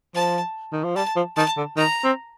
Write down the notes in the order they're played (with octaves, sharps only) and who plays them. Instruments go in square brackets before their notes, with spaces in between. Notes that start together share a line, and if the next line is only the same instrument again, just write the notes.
[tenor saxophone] F3 [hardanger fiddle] A5
[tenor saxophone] D#3
F3
[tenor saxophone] G3 [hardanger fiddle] A5
[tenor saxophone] F3
[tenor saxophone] D#3 [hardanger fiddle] A5
[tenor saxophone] D3
[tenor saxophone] D#3 [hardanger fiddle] A#5
[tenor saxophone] C4